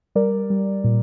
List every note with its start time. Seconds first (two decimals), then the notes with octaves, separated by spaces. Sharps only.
0.15 G3 A#4 D5
0.50 G3
0.84 A#2